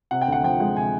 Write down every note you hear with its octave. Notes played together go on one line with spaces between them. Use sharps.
C3 F#5
G5
D2 F#5
F3 G5
G#3
C3 G#5